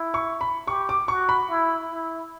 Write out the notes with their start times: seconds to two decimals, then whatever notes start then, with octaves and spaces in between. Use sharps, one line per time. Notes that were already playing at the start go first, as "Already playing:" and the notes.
Already playing: E4
0.14 C#6
0.41 B5
0.67 G4 C#6
0.89 D6
1.08 F#4 C#6
1.29 B5
1.49 E4
1.91 E4